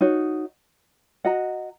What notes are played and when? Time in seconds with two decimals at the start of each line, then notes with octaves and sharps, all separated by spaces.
0.01 D#4 F#4 C#5
1.25 F#4 D#5 F#5 A#5